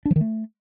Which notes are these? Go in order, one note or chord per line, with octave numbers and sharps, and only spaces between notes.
D4
F3
D#3
A3